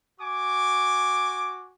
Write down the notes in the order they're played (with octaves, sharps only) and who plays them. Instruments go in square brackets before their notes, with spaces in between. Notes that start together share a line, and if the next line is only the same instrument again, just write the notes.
[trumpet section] F#4 G#5 D6